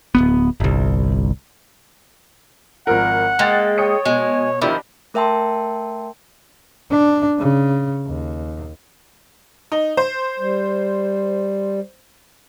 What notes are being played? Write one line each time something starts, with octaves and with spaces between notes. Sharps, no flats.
D1 C#2 B3
G1 C2
G#1 F3 A#4 F#5
G#3 A#3 G5 A6
C#5 G5 D#6 C#7
B2 G#3
D#3 F3 D4 E4 G4 B5
A3 A#4 E5 G5 A5 C6
D4
C#3
D#2
D#4
C5
G3